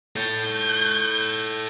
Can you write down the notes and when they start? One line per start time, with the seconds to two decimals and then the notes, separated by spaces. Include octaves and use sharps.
0.16 A4 C#5 G6